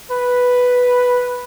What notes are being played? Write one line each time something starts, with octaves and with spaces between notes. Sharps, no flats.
B4